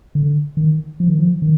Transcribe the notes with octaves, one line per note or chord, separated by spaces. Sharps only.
D3
D#3
F3
D#3
F3
D#3